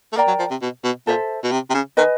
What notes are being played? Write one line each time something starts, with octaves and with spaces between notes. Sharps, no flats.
A3
A#3 A#4 D5 G5 A#5
F#3
F3
C3
B2
B2
A#2 A4 C5 E5
B2
C3
C3
C#3
D#3 B4 D#5 G#5